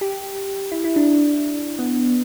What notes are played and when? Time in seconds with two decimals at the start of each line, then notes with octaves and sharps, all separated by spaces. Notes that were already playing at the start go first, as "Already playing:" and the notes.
0.01 G4
0.72 E4
0.84 E4
0.96 D4
1.79 B3